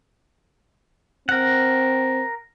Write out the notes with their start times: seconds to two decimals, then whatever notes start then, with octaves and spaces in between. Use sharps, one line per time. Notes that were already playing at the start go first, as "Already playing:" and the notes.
1.29 C4 A#4 F#5